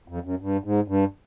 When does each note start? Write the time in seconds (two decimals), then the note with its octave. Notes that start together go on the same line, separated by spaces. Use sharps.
0.08 F2
0.24 F#2
0.40 G2
0.64 G#2
0.88 G2